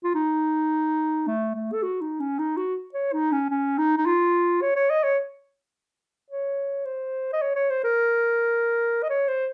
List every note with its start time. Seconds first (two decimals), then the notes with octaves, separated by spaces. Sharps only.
0.04 F4
0.15 D#4
1.27 A3
1.55 A3
1.73 A4
1.83 F#4
2.01 D#4
2.20 C#4
2.39 D#4
2.57 F#4
2.94 C#5
3.13 D#4
3.32 C#4
3.50 C#4
3.78 D#4
3.97 D#4
4.06 F4
4.62 C#5
4.76 C#5
4.90 D#5
5.03 C#5
6.30 C#5
6.85 C5
7.33 D#5
7.42 C#5
7.56 C#5
7.70 C5
7.84 A#4
9.03 D#5
9.10 C#5
9.28 C5